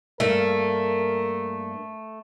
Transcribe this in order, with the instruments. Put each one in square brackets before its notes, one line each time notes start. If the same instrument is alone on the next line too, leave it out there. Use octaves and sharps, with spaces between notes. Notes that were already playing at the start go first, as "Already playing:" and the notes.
[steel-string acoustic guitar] G2 A#3 [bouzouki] A3 [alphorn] A#4